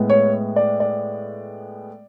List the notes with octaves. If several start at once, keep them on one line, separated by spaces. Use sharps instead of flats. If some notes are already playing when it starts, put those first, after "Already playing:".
Already playing: A2 G#3 B3
C#5
D5
D5